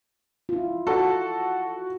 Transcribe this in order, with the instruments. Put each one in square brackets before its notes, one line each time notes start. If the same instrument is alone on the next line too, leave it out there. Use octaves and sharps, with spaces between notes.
[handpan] E4 F4
[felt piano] F#4 [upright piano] A4